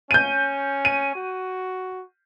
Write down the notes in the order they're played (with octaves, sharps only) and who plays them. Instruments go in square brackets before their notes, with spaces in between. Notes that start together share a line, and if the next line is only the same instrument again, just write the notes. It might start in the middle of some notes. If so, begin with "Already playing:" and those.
[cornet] C#4 [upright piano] G6 D#7
[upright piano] D#7
[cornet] F#4